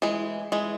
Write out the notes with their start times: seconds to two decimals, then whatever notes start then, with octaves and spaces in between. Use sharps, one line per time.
0.02 E3 G#3
0.52 E3 G#3